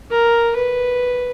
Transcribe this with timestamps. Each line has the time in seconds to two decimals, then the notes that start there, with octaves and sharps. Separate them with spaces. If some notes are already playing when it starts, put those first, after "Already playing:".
0.11 A#4
0.56 B4